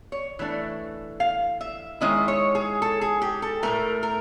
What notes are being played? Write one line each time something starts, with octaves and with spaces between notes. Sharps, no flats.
C#5
E3 A3 D4
F5
E5
D#3 G#3 C#4 E4 D#5
C#5
G#4
A4
G#4
G4
A4
A2 E3 A3 A#4
A#4